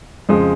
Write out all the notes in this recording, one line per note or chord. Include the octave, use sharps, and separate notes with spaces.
F2 C#3 F3 G#3